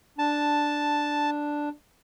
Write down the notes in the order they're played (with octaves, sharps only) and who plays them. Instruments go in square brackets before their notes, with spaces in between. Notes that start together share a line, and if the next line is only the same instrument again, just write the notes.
[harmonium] D4 [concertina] A5